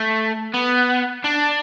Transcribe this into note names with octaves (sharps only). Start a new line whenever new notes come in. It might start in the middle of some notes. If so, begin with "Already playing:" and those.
Already playing: A3
B3
D4